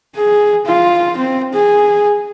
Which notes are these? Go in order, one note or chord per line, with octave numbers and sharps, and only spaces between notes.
G#4
F4
C4
G#4